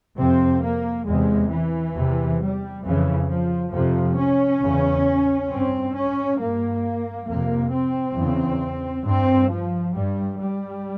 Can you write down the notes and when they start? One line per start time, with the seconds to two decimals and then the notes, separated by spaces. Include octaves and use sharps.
0.16 F2 C3 C4
0.61 A#3
1.05 E2 C3 G#3
1.49 E3
1.94 E2 C3
2.39 G3
2.83 F2 C#3 E3
3.27 F3
3.71 F2 C3 F3
4.16 C#4
4.61 E2 C#3
5.49 G2 C4
5.95 C#4
6.38 G2 A#3
7.27 F2 C3 A#3
7.72 C4
8.16 E2 C#3
9.05 G2 C4
9.49 F3
9.93 G2 G3
10.38 G3